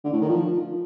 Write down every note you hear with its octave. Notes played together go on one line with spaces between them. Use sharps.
D3
A2
D#3
F3